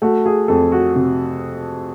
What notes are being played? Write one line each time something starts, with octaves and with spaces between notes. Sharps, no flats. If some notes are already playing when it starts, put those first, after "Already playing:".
A3 F#4
G#4
F2 A4
F#4
C3